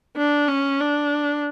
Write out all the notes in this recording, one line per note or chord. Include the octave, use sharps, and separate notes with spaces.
D4
C#4
D4